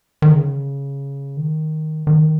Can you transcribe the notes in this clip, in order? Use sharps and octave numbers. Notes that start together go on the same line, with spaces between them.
D#3
C#3
D#3
D#3